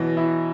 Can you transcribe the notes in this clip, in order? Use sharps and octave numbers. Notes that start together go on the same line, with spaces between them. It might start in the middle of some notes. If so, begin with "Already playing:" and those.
Already playing: B2 E3 F#3
E4